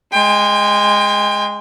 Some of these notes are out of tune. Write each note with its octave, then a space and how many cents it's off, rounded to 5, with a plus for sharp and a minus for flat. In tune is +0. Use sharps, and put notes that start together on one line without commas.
G#3 +0 G5 +35